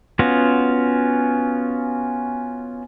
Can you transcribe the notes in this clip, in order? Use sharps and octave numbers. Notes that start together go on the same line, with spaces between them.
B3 C#4 F4 F#4